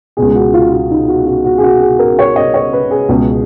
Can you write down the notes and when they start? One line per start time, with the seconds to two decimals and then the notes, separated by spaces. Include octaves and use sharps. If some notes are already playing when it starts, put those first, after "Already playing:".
0.17 C#2 B2 G#4
0.35 F#4
0.54 F4
0.73 F4
0.91 D#4
1.08 F#4
1.26 F#4
1.45 F#4
1.58 G#4
1.64 F#4
1.82 G#4
1.99 A#4
2.19 C#5
2.36 D#5
2.54 C#5
2.73 B4
2.91 G#4
3.09 C#2 B2